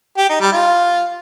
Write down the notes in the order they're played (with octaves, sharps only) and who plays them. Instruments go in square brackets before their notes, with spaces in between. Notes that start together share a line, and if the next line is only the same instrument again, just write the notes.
[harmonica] G4
D#4
G3
F4